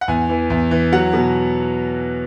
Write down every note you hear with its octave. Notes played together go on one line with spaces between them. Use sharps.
F#5
E2 G#5
E3
E2
E3
F#3 F#5
B2